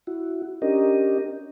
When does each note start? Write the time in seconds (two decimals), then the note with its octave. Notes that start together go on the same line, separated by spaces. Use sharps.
0.07 E4 F#4
0.62 C#4 D4 G4 A#4 D#5